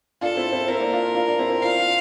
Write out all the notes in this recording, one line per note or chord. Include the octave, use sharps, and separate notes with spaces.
D4 F4 A4
C4 E4
C4 E4
C4 E4 A#4
A#3 D4
D4 F4
D4 F4
D4 F4
C4 E4
C4 E4
D4 F4 F5
D4 F4